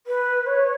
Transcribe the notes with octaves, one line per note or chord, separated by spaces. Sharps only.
B4
C#5